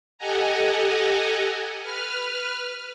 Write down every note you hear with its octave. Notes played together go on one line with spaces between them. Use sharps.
G4 A4 D#5 F#5 G#5 A#5
B4 F6